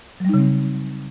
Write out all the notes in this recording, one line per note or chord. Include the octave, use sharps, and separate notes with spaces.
C#3 F#3 G3 C4 D#4